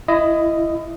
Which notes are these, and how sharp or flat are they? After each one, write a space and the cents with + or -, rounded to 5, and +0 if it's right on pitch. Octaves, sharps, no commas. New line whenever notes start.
E4 +20 D#5 +0